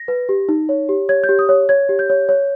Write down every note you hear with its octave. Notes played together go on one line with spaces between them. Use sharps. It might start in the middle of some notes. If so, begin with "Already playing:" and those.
Already playing: A#6
B4
G4
D#4
C#5
G4
C#5 G#6
G6
G4
D#6
C#5
C#5 G#6
G4
G6
C#5
C#5